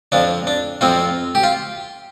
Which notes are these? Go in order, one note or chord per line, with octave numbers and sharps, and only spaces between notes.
F2 F3 D4
D4
F2 F3 C4 F4
G4
F4